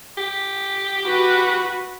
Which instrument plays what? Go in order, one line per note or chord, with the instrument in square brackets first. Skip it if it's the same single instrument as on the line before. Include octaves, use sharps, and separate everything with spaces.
[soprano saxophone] G4
[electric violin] F#4 B4